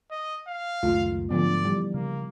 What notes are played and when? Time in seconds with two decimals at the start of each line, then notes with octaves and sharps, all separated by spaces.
0.11 D#5
0.47 F5
0.83 C#2 F#2 D#3 A3 F4
1.30 G#2 D3 F3 F#3 B3 D5
1.64 E3 G3
1.94 C#3 A#3